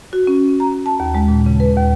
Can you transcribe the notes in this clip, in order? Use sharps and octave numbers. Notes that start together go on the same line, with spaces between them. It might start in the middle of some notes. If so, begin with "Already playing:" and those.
F#4
C#4
A#5
A5
D#2
G#3
A#2
C#3
B4
D#2